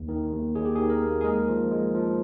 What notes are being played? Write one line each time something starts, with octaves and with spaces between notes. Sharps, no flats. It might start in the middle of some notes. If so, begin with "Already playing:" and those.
Already playing: D#2
D#3
D#2
D#2 G#4
G4
D#3 G#4
A#4
A#3
G#4
G#3 A#4
F3
G#3
F3